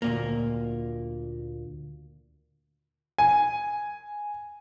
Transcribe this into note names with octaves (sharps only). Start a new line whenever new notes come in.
D2 A#2 A#3
G#5